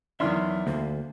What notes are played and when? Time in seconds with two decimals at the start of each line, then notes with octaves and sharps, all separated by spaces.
0.20 E2 D#3 F#3 D4 E5 C6 F6
0.67 D2 A#3